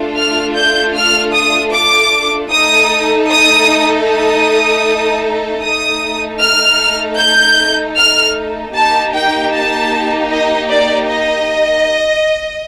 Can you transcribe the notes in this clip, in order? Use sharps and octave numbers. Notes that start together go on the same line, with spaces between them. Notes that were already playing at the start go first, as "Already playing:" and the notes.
Already playing: A3 D4 F4 A4
F6
G6
F6
D#6
D6
A3 D#4 A4 D#6
D#6
D#6
A3 D#4 A4 D#6
F6
G6
F6
A#3 D#4 G4 A5
G5
A5
D#5
D5
D#5